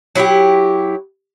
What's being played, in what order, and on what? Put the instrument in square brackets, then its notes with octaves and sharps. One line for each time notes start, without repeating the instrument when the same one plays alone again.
[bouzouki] F#3 E4 F#4 G4